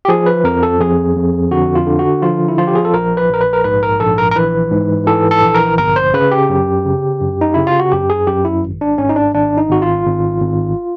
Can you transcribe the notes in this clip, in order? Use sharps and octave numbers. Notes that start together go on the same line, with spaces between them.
G4
F3 G#4
B4
F2 A#4
A4
F2 G#4
F2
D3 F#4
F4
D3
F#4
F3 F4
E4
F3 F4
G4
G#4
A4
A#1 A#4
B4
A#1 A#4
B4
A#4
G#2 B4
A#4
A#1 A4
A#4
A#4
E3 B4
G#2
E3 A4
A4
A#1
A#4
G1 A#4
C5
C#3 B4
G4
F#2
C#3
F#2
D#4
C#3 E4
F4
F#4
F#2 G4
G#4
F#2 G4
E4
G#1
D4
G#2 C#4
D#4
D4
G#1 D4
D#4
G#1 F#4
F4
G#1
G#1